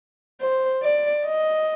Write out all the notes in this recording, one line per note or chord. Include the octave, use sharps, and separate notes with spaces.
C5
D5
D#5